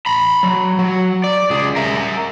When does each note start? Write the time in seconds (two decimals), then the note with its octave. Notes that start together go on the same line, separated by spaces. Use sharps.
0.06 A#5 B5
0.43 F#3
0.79 F#3
1.24 D5
1.50 C#2 G#4
1.76 A#4 E5